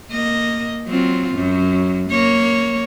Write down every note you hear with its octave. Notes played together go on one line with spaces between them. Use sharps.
A#3 D#5
F#3 C4 F4
F#2 F#3
A#3 C#5